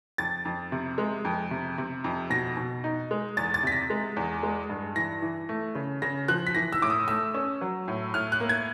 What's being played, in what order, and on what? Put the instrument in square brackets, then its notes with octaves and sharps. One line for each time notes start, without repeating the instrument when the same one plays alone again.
[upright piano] F2 A6
F2
C3
G#3
F2
C3
C3
F2
B2 A#6
B2
D#4
G#3
E2 A6
A6
C3 B6
A#6
G#3
E2
G#3
G2
E3 A#6
E3
A3
C#3
C#3 A#6
F3 F#6
B6
E3 A#6
E6
A2 D6
D#6
A3 E6
C#4
F#3
A2
A2 F6
F#6
A#3
G#6